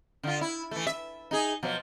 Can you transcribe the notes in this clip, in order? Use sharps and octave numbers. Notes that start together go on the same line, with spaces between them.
D3 F4
E4
E3 A3
E5
D#4 G#4
B2 F3 F#3